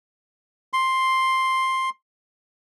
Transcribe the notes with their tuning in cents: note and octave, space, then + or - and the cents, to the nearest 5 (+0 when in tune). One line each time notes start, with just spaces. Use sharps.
C6 +5